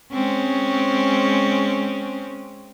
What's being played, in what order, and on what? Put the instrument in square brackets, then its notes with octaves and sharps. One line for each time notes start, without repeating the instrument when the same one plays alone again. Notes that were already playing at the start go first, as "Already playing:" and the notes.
[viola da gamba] G#3 C4 C#4